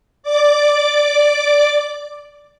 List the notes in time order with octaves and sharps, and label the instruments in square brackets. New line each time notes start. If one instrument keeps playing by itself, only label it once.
[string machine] D5 D6